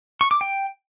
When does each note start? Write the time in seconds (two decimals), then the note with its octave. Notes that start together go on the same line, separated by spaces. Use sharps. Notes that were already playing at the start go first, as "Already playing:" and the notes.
0.21 C#6
0.31 D6
0.41 G5